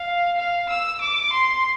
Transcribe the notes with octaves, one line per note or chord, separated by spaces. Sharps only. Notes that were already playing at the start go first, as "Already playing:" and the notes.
Already playing: F5
F5
E6
D6
C6